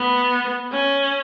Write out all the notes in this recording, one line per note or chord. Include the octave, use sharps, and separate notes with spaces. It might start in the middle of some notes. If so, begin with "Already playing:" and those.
Already playing: B3
C#4